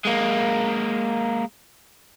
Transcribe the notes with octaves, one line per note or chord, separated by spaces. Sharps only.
G#3 A#3